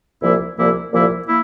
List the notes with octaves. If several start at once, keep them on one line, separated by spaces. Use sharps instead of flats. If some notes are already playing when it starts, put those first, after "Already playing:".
C2 A#2 F3 A#3 E4
C2 A#2 F3 A#3 E4
C2 A#2 F3 A#3 E4
A#3 E4